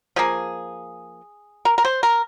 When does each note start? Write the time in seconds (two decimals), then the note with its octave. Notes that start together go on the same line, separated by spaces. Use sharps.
0.16 F3 A#3 G#4
1.65 A#4
1.78 A#4
1.85 C5
2.03 A#4